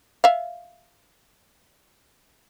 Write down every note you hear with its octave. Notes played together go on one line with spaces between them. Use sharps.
E5 F5